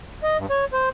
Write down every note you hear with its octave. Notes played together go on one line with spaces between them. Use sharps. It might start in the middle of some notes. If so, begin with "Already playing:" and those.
D#5
G2
C#5
C5